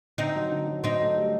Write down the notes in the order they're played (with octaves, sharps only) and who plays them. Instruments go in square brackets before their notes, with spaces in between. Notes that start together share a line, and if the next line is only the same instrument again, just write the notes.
[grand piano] D3 [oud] C4 D#4
[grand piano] F#3
D3
F#3
[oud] C4 D#4
[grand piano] A3
G3